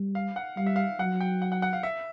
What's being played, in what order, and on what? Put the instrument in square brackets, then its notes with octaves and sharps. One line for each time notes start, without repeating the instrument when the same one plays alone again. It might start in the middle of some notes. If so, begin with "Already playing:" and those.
Already playing: [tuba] G3
[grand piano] F5
F#5
[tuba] G3 [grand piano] F5
[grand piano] E5
F5
[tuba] F#3 [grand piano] F#5
[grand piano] G5
F#5
F#5
F#5
F5
E5